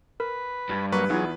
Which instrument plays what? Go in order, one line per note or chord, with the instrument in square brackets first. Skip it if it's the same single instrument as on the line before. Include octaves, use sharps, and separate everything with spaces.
[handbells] A#4 [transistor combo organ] B4
[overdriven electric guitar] G2
[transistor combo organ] F#3 A#3 C#6 [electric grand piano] B4
[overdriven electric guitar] E2 [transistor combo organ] F#3 G#4 [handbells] D#4 F4